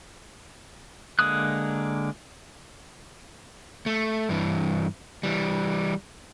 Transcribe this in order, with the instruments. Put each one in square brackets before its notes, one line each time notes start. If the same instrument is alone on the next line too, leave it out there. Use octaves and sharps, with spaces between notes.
[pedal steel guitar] D3 G#3 A#3 D#6 F#6
[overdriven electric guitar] A3
G2 E3
E3 G3